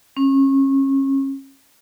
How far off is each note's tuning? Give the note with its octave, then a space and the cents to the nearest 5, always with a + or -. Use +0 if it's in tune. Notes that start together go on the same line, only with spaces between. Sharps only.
C#4 -30